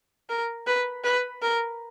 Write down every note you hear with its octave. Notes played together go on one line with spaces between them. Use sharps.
A#4
B4
B4
A#4